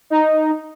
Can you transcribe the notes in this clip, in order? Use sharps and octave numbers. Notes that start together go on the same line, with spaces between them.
D#4